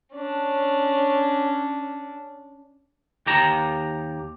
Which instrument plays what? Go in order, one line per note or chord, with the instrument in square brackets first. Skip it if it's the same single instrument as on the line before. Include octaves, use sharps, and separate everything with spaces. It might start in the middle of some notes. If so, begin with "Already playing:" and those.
[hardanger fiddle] C#4 D4
[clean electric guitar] D#2 G4 A#5